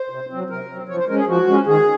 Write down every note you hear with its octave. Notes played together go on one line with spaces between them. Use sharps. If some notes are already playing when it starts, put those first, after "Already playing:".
Already playing: C5
C3
F#3 C4
C3 A#4
F#3 C4
F3 C#5
C5
G#3 C#4 A#4
G#4
F3 F#4
G#3 C#4
D#3 G#4